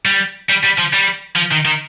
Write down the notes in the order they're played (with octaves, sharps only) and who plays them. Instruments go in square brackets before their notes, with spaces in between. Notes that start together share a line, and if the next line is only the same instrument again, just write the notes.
[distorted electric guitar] G3
G3
G3
F3
G3
F3
D#3
D#3